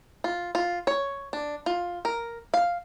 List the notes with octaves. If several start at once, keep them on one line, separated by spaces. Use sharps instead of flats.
F4
F4
C#5
D4
F4
A#4
F5